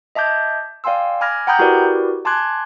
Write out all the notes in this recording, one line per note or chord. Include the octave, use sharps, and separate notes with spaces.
D#5 E5 A5 D6 G6 G#6
D5 F5 G5 G#5 C6 E6
G#5 B5 D6 F6 G#6 A#6
F#5 G5 A#5 B5 D#6 G6
E4 F#4 G4 A#4 B4 D5
G#5 A5 C6 D6 F#6 G#6